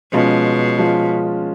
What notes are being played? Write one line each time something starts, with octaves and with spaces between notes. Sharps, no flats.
B2 F3 G#3 C#4 F4
F3 G#3 C#4 F4